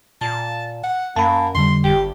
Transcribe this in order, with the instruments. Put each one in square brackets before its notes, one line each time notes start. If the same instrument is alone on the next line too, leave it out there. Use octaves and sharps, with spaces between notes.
[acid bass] A#2 [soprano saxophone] A5
[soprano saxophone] F#5
[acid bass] F#2 [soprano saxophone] A#3 [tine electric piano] A5 B5
[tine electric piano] F2 D3 G3 [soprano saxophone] C6
[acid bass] G1 [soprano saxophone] G4